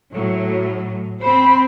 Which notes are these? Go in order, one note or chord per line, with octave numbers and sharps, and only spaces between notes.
A2 F#3
C4 C5 B5